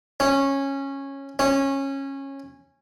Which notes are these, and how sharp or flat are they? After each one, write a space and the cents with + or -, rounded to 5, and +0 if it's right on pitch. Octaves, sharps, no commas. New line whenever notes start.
C#4 -15
C#4 -20